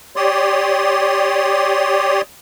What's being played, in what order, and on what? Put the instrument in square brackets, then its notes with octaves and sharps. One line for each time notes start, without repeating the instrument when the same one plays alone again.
[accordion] G4 C#5 D5 C6 D#6